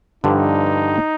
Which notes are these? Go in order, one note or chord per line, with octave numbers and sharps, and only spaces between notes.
G2 D3 F3 D#4